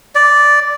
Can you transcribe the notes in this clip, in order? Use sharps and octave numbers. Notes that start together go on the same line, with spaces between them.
D5